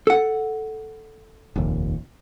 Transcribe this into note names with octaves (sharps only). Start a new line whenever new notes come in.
A4 F#5
F1 A#1 D#2